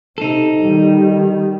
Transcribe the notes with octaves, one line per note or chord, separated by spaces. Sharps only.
C3 D#4 A4
D#3 G3